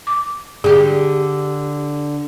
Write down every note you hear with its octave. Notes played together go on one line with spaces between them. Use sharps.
D6
D3 G4 G#4